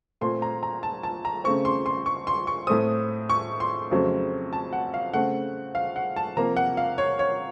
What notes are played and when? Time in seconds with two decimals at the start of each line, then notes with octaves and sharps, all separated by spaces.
0.21 A#2 A3 C4 C6
0.42 A#5
0.63 A#5
0.83 A5
1.03 A5
1.25 A#5
1.44 C#3 A3 C4 C#6
1.65 C6
1.86 C6
2.06 C#6
2.27 C6
2.47 C#6
2.67 A2 A3 C4 D#6
3.29 C#6
3.60 C6
3.91 F2 C#3 F#3 A3 C4
4.53 A5
4.73 F#5
4.94 F5
5.14 C#3 A3 C4 F#5
5.75 F5
5.96 F#5
6.16 A5
6.37 C3 F3 A#3 A#5
6.57 F#5
6.77 F5
6.98 C#5
7.19 C#5